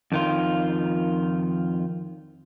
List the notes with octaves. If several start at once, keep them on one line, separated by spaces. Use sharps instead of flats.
F2 D#3 F4